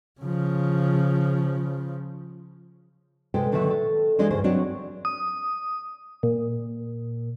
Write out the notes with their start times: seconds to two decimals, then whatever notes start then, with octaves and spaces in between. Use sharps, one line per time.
0.21 C#3 F3
3.34 C3 G#3 A4 B4 G5
3.52 A#2 D3 D#3 F#3 B4 E5
3.70 A4
4.18 E3 F3 G#3 D4 D#4 D#5
4.30 D2 G2 C#3 E3 G#4 C5
4.44 F#3 C4 D4 D#4 F#4 C#5
5.05 D#6
6.23 A#2